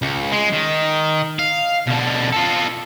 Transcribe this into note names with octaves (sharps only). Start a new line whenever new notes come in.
C#2
G#3
D#3
F5
B2 D3
F4 A4